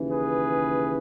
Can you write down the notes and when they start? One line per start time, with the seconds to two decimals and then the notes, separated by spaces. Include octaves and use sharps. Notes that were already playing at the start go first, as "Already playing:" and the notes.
Already playing: D#2 C#3 E3
0.10 G#4 B4